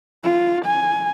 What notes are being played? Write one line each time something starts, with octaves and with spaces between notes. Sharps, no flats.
F4
G#5